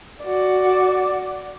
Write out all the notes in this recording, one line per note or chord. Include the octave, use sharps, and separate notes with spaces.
F#4 D5